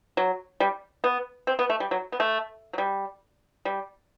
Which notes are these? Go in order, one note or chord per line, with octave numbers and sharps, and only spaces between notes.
F#3
G3
B3
C4
B3
A3
G3
F#3
B3
A3
F#3
G3
G3